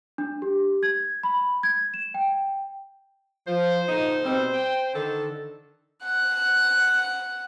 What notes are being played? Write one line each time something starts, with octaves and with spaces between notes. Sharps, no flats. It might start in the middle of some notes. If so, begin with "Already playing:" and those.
D4
G4
G#6
B5
G#6
E7
G5
F3 C5
A#2 D3 D#4
B2 G3 C4
G5
D3 D#3 A4
F#5 F#6